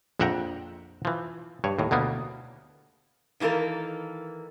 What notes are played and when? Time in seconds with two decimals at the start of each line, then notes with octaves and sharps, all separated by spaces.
0.20 A#1 F2 E5 F#5 G5 A#5
1.05 E3 F3
1.64 G2 C#5
1.79 D#2 A2
1.91 D2 B2 A#3 B3
3.40 D#3 E3 A#3 A4 A#4